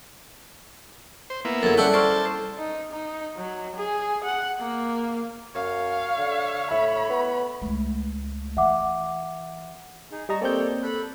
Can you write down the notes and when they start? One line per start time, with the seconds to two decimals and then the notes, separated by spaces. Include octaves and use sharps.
1.30 C5
1.45 A#3 B3 E4
1.63 F#2 G#4 A4
1.77 G3 C#4 D4 E4 A4 F#5 G5
1.93 C5 D5 A5 C#6 F6
2.57 D#4
2.91 D#4
3.37 F#3
3.76 G#4
4.24 F#5
4.59 A#3
5.55 F#2 C#5 F5
6.18 D3
6.71 A2 E5 B5
7.10 B3
7.62 C#2 A3
8.57 E3 E5 F#5 D6
10.12 D#4 G#4
10.29 G3 D#5 A5 A#5 C#6
10.41 A#3 C4 A4 C#5 D5 G6
10.83 A4 B5 F#6